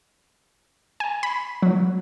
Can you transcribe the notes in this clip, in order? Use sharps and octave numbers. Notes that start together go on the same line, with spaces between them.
G#5
B5
F#3